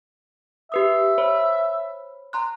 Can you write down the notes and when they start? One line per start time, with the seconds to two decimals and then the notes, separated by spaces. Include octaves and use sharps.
0.72 G4 B4 E5 D#6
1.18 C5 C#5 B5
2.33 A#5 C6 F#6